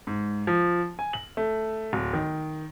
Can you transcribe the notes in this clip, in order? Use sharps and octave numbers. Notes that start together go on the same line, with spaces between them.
G#2
F3
G#5
F#7
A3
D1
D#3